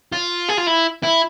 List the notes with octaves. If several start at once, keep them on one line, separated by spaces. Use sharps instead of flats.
F4
G#4
F4
E4
E4